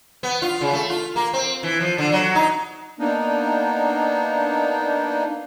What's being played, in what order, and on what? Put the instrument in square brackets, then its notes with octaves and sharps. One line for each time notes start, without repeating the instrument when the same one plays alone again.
[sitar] B3
F4
C#3
A3
F4
A#3
C4
E3
F3
D3
F#3
D#4
[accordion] A#3 B3 D4 D#4